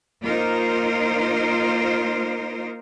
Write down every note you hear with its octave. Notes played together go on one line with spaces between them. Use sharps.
A#3 D#4 F4 A#4 C5